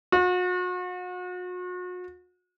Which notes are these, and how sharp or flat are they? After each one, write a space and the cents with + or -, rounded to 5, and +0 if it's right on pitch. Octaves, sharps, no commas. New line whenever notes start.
F#4 -40